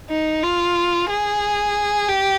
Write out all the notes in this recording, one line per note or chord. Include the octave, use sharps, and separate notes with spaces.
D#4
F4
G#4
G4